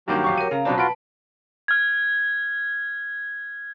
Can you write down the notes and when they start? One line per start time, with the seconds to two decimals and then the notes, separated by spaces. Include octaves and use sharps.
0.08 G2 D#3 F#3 A#3 G4
0.24 D1 F5 C#6
0.38 A#4 C#5 D#7
0.51 C#3 F5 A#5
0.65 B2 F#3 C4 D4 A5 B5
0.78 F4 F#4 B4 A5 B5 D7
1.68 F6 G#6